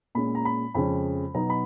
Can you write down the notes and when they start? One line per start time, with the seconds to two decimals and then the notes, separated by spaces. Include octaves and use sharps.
0.15 A#2 G#3 C#4 B5
0.35 A#5
0.45 B5
0.74 F2 C#3 G#3 C#4 B5
1.34 B2 F#3 B3 D#4 A#5
1.50 B5